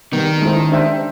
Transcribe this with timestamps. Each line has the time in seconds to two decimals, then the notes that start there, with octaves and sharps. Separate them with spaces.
0.12 D#3 G3 B3 D#4
0.42 G#3 C#4 E4 A4 C5
0.72 D4 G4 C5 E5 G5